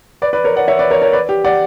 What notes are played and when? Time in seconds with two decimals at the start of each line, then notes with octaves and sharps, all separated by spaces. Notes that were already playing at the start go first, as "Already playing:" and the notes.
0.22 B4 D5
0.33 B4 D5
0.44 A#4 C#5
0.56 D5 F#5
0.68 C#5 E5
0.79 B4 D5
0.90 A#4 C#5
1.02 A#4 C#5
1.13 B4 D5
1.29 G4
1.44 D5 F#5